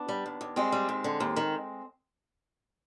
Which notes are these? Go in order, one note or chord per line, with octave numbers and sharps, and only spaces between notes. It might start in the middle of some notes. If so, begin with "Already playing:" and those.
Already playing: B3 D4
G3
D#2
D#2
G3 G#3 C4
G3
D#2
D3
D#2
D#3